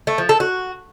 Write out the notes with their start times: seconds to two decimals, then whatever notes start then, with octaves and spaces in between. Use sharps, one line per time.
0.07 A3
0.18 F3
0.29 A4
0.40 F#4